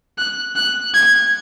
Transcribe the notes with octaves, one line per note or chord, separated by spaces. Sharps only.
F#6
F#6
G#6